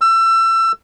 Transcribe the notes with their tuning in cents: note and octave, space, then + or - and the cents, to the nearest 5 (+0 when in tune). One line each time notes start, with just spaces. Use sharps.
E6 +25